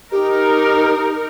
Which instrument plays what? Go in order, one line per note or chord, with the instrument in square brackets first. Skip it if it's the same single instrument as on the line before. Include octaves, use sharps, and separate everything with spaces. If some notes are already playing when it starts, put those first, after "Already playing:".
[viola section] D#4 A#4 [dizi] G4